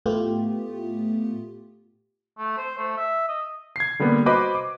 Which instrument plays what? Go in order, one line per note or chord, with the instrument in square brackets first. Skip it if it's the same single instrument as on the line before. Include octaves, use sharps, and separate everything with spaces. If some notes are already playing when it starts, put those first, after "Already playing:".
[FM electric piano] A2 A3 B3 F4 G4
[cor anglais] A3
C5
A3
E5
D#5
[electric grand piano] G#6 C7
D3 G3 A#3 B3
F#4 B4 C5 D#5 B5 D6
D6